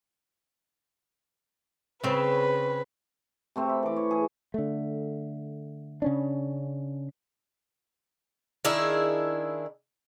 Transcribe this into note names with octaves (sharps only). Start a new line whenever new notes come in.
C#3 C4 B4
C3 A3 C4
B5
E3 D6
C#5
G#4
D3 A3
C#3 C#4 D4
D#3 D4 E4 G#4